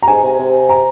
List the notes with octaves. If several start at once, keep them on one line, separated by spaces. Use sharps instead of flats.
A#5
G#2 G#5
C3
C3
A#5